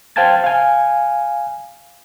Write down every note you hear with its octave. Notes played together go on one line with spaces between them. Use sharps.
C5 F5 G5 A5 G#6 A6
F5 G#5